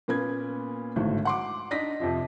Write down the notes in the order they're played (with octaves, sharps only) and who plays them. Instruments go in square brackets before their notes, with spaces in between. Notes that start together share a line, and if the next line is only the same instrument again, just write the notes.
[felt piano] A#2 A#3 B3 C#4 G#6
G#1 A2 D3 F#4
F#5 C6 D6
D4 D#4 A#6 B6
F2 C3 F3